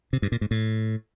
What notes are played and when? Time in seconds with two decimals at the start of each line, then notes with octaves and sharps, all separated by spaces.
0.13 C3
0.22 G2
0.32 A#2
0.41 G#2
0.51 A2